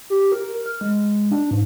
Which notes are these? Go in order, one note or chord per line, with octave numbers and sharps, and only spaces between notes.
G4
A#4
F6
G#3
D4
G#2